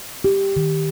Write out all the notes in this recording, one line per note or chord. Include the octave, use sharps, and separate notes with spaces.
G4
D#3